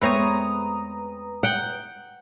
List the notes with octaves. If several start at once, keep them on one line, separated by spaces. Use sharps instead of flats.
E2 G#3 A3 C4 B4 C#5 A#5 D#6
F#5 G5